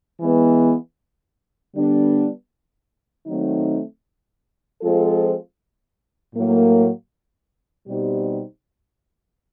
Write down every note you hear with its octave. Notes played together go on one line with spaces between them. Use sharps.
E3 G#3 B3
D3 G3 B3 D4
D#3 F#3 A3 C4 D#4
F3 G#3 C4 F4 A4
A2 F#3 A#3
B2 G3 C4 D#4 G4